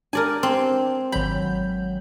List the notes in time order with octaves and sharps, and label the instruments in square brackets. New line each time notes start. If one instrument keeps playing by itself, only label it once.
[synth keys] D4 G4 [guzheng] A#4 D5 G#5
[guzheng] C4
[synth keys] G#1 F#3 G6 [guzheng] B5